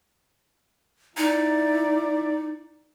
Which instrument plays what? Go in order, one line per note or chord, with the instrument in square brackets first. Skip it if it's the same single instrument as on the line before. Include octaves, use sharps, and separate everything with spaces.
[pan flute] D#4 [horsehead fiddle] E4 D5